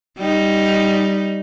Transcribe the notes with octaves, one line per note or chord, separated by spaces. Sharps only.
G3 D#4